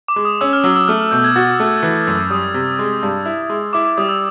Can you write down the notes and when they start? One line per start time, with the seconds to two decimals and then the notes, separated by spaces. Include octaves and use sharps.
0.08 D6
0.16 G#3
0.25 D#6
0.41 C#4 E6
0.53 F6
0.64 F#3 E6
0.76 E6
0.88 A3 F6
1.01 F6
1.11 B2 G6
1.24 G#6
1.36 F#4 A6
1.60 A3
1.83 E3
2.07 F#2
2.30 G3 D#6
2.54 C3
2.79 G#3
3.03 G2
3.25 E4
3.50 G#3
3.73 E4 D6
3.85 D6
3.98 G3 D#6
4.09 E6